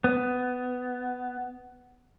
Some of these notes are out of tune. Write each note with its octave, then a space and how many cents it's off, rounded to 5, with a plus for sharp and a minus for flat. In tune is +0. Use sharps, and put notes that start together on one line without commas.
B3 +15